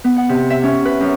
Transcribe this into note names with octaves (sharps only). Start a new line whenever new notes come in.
B3
F#5
C3
E5
C#4
B4
F#2